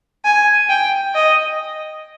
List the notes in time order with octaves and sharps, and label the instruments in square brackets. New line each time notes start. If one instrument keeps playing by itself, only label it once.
[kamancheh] G#5
G5
D#5